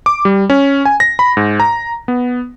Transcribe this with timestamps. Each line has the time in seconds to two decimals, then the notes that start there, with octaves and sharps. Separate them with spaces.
0.06 D6
0.25 G3
0.50 C#4
0.85 G#5
1.00 A#6
1.19 B5
1.37 G#2
1.60 A#5
2.08 B3